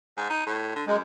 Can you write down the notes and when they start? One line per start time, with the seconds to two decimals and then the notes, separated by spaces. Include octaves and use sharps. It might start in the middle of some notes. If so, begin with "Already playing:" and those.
0.18 G#2
0.30 D#4
0.47 A2
0.75 D3
0.87 F#2 G#3